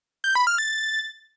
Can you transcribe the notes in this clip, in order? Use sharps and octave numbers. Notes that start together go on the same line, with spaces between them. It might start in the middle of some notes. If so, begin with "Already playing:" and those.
G6
B5
F6
A6